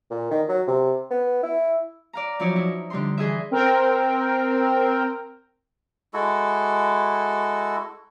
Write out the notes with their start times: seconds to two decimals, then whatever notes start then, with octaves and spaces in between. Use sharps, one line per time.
0.11 A#2
0.31 D#3
0.49 F#3
0.68 C3
1.11 B3
1.43 E4
2.13 D5 F5 A#5
2.39 F3 F#3 E4 F4 C#5 D5
2.56 D#4 E4
2.90 D3 G3 D#4 C6
3.18 E3 G#4 D#5 E5
3.51 C4 A#4 G5
6.14 G#3 E4 F#4 A4